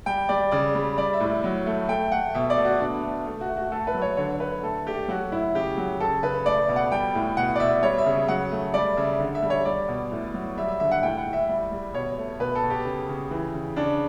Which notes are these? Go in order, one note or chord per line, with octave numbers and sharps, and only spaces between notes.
G3 G5
G3 D5
C#3 D5
G3
G3 D5
E5
A2
F#3
A3
A3 G5
A3 F#5
B2 E5
D5
A3
F#4
B2 D4
A3
A3
F#4
A3
F#4
A3 A4
B4
F#3
C#5
D3 C#5
D3 B4
A3 A4
A3 G4
F#3 F#4
A2 E4
C#3 G4
F#3
C#3 A4
C#3 B4
A3 D5
B2
F#5
G3 G5
A2
B2 F#5
D5
B2 E5
G3 C#5
E5
C#3
F#3 F#5
A3
G3 D5
C#3 E5
D3
E5
G3
C#5
G3 D5
B2
A2
F#3
G3 E5
E5
D3 E5
F#5
A2 G5
F#5
A2
E5
G3
G3
B2 C#5
A3
B2 B4
A4
B2
G4
C#3
C#3
E3
C#3
C#3 D4